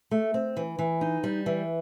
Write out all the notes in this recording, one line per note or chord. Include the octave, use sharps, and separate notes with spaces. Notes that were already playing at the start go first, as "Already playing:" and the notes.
A3
C4
E3
E3
D#4
G3
E3